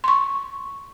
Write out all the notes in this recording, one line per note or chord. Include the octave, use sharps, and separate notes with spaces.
C6 C#6